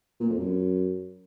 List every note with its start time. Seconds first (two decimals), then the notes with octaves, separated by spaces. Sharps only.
0.20 A#2
0.29 F2
0.39 F#2